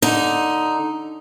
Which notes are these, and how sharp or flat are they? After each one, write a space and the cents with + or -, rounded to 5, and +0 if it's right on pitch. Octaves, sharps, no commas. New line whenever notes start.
D3 -5 D#4 +0